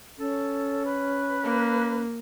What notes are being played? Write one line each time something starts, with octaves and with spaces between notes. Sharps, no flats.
C#4 A4
B4
A#3